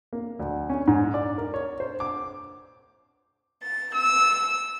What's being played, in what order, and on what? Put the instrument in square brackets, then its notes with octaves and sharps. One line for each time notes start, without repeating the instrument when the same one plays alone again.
[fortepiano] A#3
D2
C#4
G#2
D5
A#4
C#5
C5
D6
[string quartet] A6
E6